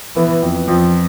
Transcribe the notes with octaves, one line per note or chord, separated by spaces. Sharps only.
E3 B3
F2
F2 F3